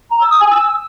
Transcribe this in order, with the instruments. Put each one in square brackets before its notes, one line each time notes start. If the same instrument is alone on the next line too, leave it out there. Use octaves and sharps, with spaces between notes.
[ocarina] A#5
E6
D#6
G#5
E6